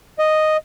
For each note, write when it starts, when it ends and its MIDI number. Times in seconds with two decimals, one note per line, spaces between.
0.19 0.57 75